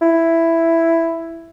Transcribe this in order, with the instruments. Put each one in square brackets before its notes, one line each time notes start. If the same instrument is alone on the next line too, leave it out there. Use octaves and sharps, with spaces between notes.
[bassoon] E4